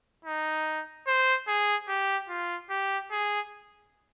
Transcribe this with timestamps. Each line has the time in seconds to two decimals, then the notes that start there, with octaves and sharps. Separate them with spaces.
0.25 D#4
1.07 C5
1.48 G#4
1.88 G4
2.29 F4
2.70 G4
3.12 G#4